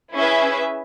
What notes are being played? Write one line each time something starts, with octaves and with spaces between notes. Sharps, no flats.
C#4 E4 G#4 B4 E5